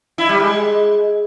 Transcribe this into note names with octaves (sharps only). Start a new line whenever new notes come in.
E4
G3
G#3